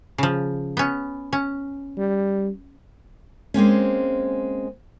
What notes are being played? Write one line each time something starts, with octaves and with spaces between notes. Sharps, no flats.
C#3 F3
B3 C#4
C#4
G3
G#3 A#3 C4 C#4